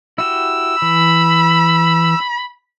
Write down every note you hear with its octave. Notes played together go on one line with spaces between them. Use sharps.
E4 F#4 G4 E6
E3 B5